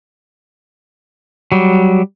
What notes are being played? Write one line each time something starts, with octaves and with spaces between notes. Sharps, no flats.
F#3 G3